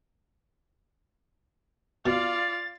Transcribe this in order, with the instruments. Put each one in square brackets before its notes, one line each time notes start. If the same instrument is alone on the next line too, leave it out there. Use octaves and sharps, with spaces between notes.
[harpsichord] B2 [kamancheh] F4 D5 [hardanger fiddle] F5 [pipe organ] A6